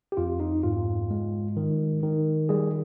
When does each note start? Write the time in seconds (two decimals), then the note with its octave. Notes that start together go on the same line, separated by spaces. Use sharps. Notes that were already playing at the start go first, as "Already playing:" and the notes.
0.12 G4
0.17 F2 F4
0.40 D#4
0.63 G#2 F4
1.10 G#3
1.57 D#3
2.03 D#3
2.49 G3 G#4